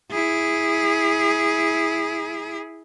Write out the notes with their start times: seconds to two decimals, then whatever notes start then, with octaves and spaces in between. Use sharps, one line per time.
0.12 E4 G#4